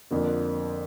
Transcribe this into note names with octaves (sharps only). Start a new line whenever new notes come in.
F2 D3 F3 A#3